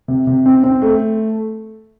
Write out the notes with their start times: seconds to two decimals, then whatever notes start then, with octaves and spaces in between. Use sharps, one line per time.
0.08 C3
0.27 C3
0.46 C4
0.64 C4
0.82 A3